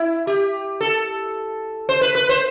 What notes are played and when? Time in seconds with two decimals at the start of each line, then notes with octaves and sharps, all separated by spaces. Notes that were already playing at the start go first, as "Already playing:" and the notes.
Already playing: E4
0.27 G4
0.81 A4
1.89 C5
2.01 B4
2.15 B4
2.29 C5